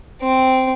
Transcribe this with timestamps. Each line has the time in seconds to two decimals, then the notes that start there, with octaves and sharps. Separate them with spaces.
0.22 C4